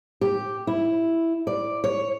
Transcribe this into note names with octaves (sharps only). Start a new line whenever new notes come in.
G4
E4
D5
C#5